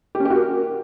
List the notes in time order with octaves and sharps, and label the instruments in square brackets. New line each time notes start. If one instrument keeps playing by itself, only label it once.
[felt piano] G4
C#4
G4
F#4
A#4